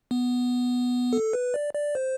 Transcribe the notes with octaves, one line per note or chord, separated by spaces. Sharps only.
B3
A4
B4
D5
D5
C5